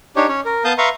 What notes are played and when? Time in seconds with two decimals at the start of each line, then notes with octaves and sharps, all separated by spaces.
0.16 D4 D#4 G4 C#5
0.28 C#4 C#5
0.45 A#4
0.65 B3 F5 A5 D#6 G6
0.78 B4 E5 F5 A#5 C6 C#6